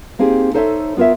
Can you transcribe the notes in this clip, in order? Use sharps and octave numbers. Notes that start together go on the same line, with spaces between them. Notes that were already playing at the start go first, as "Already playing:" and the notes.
A#3 C4 D#4 G4 G#4
D#4 A4 C5 C#5 D#5 E5
B3 F4 A#4 C#5 E5